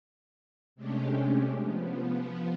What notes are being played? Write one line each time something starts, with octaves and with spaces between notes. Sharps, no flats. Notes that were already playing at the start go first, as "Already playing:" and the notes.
C3 G#3 A3 C#4 D4 G4
F3 B3